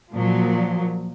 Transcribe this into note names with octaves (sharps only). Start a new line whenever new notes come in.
A#2 F3 F#3